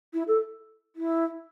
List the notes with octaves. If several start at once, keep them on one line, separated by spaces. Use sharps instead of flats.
E4
A4
E4